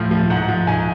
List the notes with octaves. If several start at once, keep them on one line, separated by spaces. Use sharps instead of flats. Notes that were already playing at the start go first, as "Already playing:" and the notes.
Already playing: A2 F3 F6
F3
G#2 F#5
F3
G#2 G#5